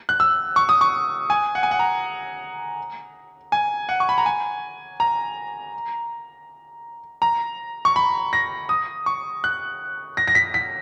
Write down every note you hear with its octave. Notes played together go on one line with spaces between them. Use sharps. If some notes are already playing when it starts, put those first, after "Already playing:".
F#6
E6
C#6
D#6
C#6
G#5
F#5
G#5
F#5
A#5
G#5
F#5
C#6
B5
A#5
G#5
A#5
A#5
C#6
B5
A#6
D#6
C#6
F#6
A#6
A#6
B6
B6